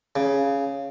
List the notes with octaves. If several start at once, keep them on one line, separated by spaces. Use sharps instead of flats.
C#3